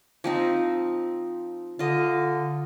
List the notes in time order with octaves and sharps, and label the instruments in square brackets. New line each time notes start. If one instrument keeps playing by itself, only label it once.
[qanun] F3 C4 D#4
[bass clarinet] D3 [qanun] F4 D#5